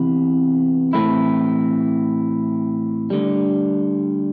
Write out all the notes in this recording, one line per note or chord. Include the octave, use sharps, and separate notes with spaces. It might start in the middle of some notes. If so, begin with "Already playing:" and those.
Already playing: C3 E3 B3
A2 E3 A3 C4 E4
D2 D3 G3